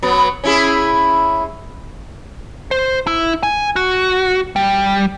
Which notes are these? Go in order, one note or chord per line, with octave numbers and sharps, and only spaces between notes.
F#3 B3
C#4 E4 G#4
C5
E4
G#5
F#4
G3